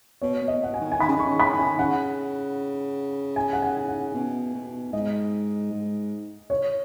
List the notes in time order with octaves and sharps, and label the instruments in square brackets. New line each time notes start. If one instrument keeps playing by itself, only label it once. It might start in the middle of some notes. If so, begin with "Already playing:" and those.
[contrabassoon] B2 [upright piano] C#5
[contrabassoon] B2
[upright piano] D#5
[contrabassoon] B2 [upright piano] F#5
[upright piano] G#5
[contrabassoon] D#3
[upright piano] G#5
[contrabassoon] D#3 [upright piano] B5
[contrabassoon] C#3
[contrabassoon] D#3 [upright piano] C#6
[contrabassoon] C#3
[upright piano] B5
[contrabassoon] D#3
[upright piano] G#5
[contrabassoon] C#3 [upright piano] F#5
[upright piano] G#5
F#5
G#5
F#5
[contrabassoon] B2
B2
[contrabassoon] G#2 [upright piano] D#5
[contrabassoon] G#2
[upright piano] C#5